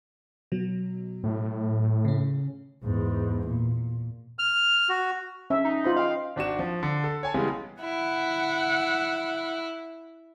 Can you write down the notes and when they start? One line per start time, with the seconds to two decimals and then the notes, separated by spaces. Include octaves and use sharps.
0.52 B2 F#3
1.24 A2
2.05 C#3 C#4
2.83 E2 G#2
3.47 A#2
4.39 F6
4.89 F#4
5.50 C#4 E5
5.65 D#4
5.84 F4 C5 B5
5.96 D#5 F5 G5
6.36 G#1 D4 F#4 E7
6.59 F3
6.83 D3
7.04 A4
7.23 C#5 G#5 A5
7.34 C#3 E3 G3 G#3 B3
7.81 E4 F#5